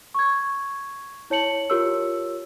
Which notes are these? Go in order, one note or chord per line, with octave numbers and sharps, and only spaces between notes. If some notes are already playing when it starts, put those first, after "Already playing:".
C#6 G#6
E4 C#5 A5 C#7 F#7
F4 G4 A#4 C#5 E6